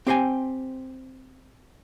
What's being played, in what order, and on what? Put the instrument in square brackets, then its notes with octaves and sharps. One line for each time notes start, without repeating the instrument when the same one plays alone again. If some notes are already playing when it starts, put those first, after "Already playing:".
[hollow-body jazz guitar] C4 G4 C5 G5 G#5